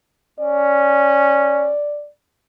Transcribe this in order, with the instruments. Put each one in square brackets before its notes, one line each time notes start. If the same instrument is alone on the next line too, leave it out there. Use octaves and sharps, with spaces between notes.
[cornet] C#4 [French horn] D5